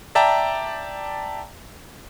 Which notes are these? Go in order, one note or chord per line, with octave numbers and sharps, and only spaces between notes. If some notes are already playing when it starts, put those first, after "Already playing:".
D5 E5 G5 A5 A#5